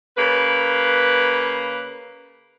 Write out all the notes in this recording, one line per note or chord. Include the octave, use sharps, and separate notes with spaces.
C#3 A#3 B4